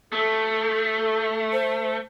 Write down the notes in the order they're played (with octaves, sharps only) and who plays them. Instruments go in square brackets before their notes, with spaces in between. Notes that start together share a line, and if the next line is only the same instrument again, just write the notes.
[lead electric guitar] A3 [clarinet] A4
[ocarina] C5